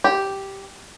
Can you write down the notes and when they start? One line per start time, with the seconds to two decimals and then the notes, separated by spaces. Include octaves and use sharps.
0.04 G4